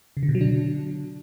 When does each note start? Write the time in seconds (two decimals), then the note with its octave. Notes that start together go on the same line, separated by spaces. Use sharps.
0.17 C#3
0.23 D3
0.29 B2
0.35 F#3
0.41 D4